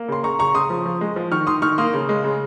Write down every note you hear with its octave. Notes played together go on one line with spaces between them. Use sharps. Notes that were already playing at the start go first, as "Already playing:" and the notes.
Already playing: A#3
C#3 C6
C#3 A#5 C#6
C#3 A#5 C#6
C#3 C6 D#6
F3
F3
G#3
F3
D#3 C#6 F6
D#3 C6 D#6
D#3 C#6 F6
A#3 C6 D#6
C#3
G#3
C#3